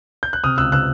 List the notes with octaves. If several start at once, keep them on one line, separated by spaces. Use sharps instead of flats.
G6
F#6
C3 D#6 F6
C#2 E6 F#6
C3 E6 F#6